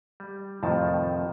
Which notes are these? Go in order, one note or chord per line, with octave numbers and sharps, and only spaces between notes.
G3
F2 A2 C3 D#3 F3 A5